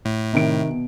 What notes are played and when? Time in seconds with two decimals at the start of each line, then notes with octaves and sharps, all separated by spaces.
0.05 A2
0.33 C3 D#3 D7
0.70 B2